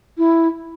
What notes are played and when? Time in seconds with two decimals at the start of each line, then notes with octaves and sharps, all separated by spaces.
0.18 E4